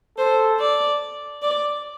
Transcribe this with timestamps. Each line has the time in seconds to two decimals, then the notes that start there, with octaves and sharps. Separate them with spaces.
0.18 A4 C5
0.60 D5
1.42 D5